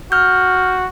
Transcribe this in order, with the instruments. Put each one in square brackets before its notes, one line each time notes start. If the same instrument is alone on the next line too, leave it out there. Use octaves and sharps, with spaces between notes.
[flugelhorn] F#4 [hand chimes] F6 G6